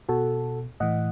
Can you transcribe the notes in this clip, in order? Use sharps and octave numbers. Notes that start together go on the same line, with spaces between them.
B2 F#4 A4
A2 E3 D#5 F#5